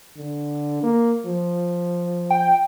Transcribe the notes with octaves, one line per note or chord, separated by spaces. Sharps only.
D3
A#3
F3
G5